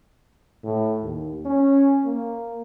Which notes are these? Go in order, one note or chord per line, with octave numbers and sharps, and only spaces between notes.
A2
D#2
C#4
A#3